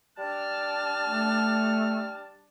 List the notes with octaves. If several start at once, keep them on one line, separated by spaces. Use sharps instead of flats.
G3 D4 A5 F6
A3